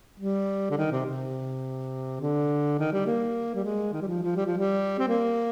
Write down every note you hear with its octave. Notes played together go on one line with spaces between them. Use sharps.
G3
D3
D#3
C3
C3
D3
D#3
G3
A#3
G3
G#3
D#3
G3
F3
F3
G3
F3
G3
C4
A#3